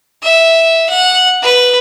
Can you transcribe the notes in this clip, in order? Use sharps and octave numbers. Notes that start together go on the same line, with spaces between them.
E5
F#5
B4